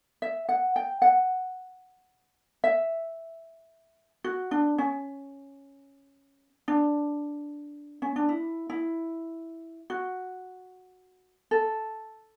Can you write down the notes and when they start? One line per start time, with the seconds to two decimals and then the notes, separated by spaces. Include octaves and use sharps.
0.22 E5
0.49 F#5
0.76 G5
1.02 F#5
2.64 E5
4.24 F#4
4.51 D4
4.78 C#4
6.68 D4
8.02 C#4
8.16 D4
8.29 E4
8.70 E4
9.90 F#4
11.51 A4